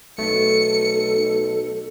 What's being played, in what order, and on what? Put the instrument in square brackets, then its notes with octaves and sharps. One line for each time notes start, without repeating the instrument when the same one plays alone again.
[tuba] B1 [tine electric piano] A3 [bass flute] A4 [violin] C#7